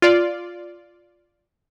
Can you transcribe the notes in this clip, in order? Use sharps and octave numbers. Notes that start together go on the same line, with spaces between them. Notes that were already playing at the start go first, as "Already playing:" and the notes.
F4 D5